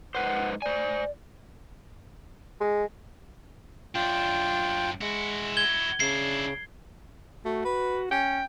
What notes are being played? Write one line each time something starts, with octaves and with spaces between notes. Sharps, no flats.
G#2 B4 C5 F#5
C5 D5 G#5
G#3
F#2 D4 F4 G5
G#3 E4 F#4
G#6 G7
C#3 D4 E4 C7
A3 F#4
B4
C#4 G5